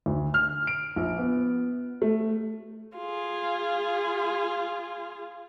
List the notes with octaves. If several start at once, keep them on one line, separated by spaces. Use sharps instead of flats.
D2
F6
D7
A#1
B3
A3
F4 G#4